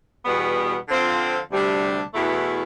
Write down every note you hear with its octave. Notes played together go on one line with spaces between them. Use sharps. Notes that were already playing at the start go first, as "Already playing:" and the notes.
E2 B2 G3 B3
D3 F3 C4 F4
D2 C3 G3 D4
E2 B2 A3 E4